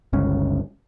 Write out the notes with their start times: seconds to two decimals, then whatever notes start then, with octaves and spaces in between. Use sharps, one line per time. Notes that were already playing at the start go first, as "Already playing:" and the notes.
0.13 G1 C#2 C#4